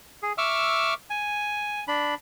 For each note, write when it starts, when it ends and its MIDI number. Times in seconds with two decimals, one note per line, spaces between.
0.23 0.33 68
0.38 0.94 76
0.38 0.94 85
0.38 0.94 86
0.38 0.94 88
0.38 0.94 89
1.10 1.84 80
1.88 2.15 62
1.88 2.15 83